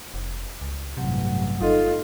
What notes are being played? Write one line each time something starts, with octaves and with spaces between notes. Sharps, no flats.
F1
C#2
A1 E2 G2 C3 F#3 F#5
G1 D#4 F4 A4 D#5